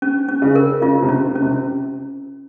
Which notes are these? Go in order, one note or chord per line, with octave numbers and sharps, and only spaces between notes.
C#4
C#4
C#3
A#4
C#3 F4
C3
C#4
C#4
C3